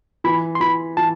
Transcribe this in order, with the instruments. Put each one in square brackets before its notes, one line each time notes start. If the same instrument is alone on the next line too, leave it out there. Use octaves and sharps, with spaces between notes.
[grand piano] E3 [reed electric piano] B5
[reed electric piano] C6
[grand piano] E3 [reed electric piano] B5
[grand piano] E3 [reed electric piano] A5